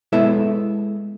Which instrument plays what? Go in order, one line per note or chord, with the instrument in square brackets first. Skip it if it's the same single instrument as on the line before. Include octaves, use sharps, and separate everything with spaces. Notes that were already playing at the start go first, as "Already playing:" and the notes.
[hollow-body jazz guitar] G#3 B3 E4 A4 E5